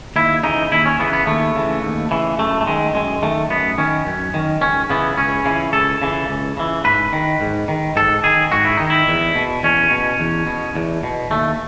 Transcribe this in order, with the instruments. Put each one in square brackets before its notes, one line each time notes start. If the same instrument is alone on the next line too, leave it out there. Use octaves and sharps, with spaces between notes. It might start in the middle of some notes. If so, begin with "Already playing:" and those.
[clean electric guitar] D#2 E4
C#3 E3 D#4
D#2 E4
C#4
C#3 E3 B3
B3
D#2 A3
C#3 E3
D#2
C#3 E3
F#2 A3
A3
D#3 G#3
F#2 G#3
D#3 A3
F#2 B3
D#3 C#4
F#2
D#3
C#2 C#4
C#3 E3 B3
C#2 C#4
C#3 E3
C#2 A4
C#3 E3
C#2
C#3 E3
G#2 B4
D#3
G#2
D#3
G#2 A4
D#3 G#4
G#2 F#4
E4
D#3 D#4
E4
E2
B2
E2 C#4
B2
E2
B2
E2
B2
D#2 A3